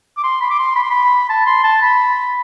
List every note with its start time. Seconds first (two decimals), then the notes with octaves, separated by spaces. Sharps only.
0.18 D6
0.23 C6
0.41 B5
0.50 D6
0.59 C6
0.76 B5
0.84 C6
0.90 B5
1.29 A5
1.46 C6
1.64 A5
1.82 B5